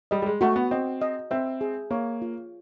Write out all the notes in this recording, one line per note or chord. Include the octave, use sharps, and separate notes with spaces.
G3 D#5
G3
G#3
A3 F#4
B3
C4 D#5
D#5
C4 E5
G#4
A#3 C#5
F4